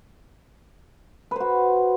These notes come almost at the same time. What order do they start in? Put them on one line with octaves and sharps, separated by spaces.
B4 C5 F#4